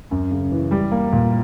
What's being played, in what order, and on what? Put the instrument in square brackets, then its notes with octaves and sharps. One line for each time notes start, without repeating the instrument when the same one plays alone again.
[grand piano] F#2
C#3
E3
G3
A#3
A#2